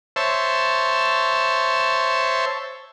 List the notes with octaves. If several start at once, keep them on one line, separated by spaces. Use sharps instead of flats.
C5 C#5 E5 A5